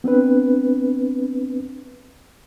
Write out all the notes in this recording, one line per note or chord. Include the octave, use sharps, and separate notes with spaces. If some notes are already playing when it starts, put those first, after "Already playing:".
B3 C4 D4 B4